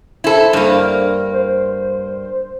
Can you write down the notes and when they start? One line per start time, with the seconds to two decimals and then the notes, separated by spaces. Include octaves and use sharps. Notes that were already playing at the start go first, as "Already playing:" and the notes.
0.24 E4 A4 C5
0.53 G2 A#3
1.33 C5